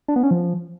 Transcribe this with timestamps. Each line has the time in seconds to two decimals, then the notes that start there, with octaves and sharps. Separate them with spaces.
0.08 D4
0.16 B3
0.23 C#4
0.31 F3